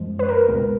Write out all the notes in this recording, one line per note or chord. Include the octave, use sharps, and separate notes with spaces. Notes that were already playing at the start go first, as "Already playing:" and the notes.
Already playing: F#2 F3 G#3
B4
A#4
C#2 B2 G#3